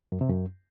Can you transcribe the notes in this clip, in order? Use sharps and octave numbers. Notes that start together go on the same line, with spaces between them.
F#2
C3
F#2